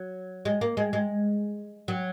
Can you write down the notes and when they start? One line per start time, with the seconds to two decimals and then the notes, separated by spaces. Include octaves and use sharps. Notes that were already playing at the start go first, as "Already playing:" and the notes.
Already playing: F#3
0.45 G#3
0.61 A#3
0.77 G#3
0.93 G#3
1.88 F#3